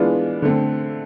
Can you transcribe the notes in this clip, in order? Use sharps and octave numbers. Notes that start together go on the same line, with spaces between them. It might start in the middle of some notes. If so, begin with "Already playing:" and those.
Already playing: E3 G#3 B3 D4 F4
D3 A3 C4